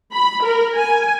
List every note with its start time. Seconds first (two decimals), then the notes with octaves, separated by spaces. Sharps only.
0.13 B5
0.42 A#4
0.76 G#5